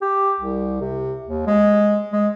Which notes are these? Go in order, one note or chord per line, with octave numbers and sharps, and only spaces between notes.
G4
C2
C3
D#2
G#3
G#3